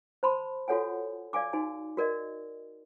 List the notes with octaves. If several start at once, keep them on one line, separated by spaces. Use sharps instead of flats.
C5 A5 B5 C6
F4 F#4 A4 C#5 F#5 G#5
D5 F5 G#5 D6
D#4 F#4 G#5
F#4 A#4 D5 D#5